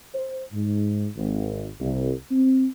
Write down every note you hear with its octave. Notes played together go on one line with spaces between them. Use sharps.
C5
G#2
G#1
C2
C4